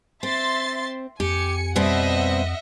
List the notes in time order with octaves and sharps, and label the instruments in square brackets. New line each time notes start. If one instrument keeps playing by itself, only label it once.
[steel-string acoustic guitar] C4 [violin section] E5 C6 A6
[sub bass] F2 [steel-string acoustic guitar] G4 [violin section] G#5 C#7
[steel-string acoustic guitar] B2 G3 C4 [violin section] D#5 E5 F#5